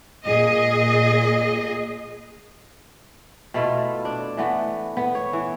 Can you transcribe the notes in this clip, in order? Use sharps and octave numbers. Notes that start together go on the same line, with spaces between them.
A#2 G#4 D#5
B2 A3 E4 F4
D4
E3 A3 B3
B3
C#5
E3